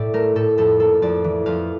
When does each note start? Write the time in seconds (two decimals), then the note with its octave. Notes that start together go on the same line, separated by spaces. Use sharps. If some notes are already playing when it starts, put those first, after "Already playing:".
Already playing: A2 D5 E5
0.14 A3 A#4
0.36 A2 A4
0.58 F2 A4
0.80 A#3 A4
1.02 F2 D5
1.24 E3
1.46 F2 F5